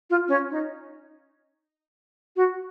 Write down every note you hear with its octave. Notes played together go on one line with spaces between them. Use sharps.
F4
C#4
D#4
F#4